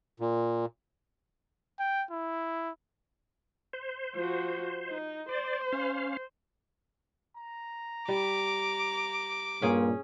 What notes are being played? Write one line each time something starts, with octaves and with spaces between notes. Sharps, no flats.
A#2
G5
E4
C5
F3 F#4
D#4
C5 D5
C#4 F5
A#5
G3 D6
G2 A#2 C#4 G#4